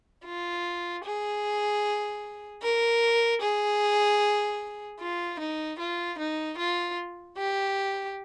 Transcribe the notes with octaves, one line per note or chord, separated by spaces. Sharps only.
F4
G#4
A#4
G#4
F4
D#4
F4
D#4
F4
G4